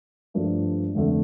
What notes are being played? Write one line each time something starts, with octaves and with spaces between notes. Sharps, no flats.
G2 F3 A3 D4
F1 F2 D3 A3